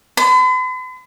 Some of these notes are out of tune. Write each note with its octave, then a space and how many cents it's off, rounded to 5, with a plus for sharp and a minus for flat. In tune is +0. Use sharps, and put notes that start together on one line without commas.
B5 +45